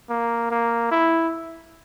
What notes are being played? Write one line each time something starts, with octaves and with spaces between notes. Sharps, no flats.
A#3
A#3
E4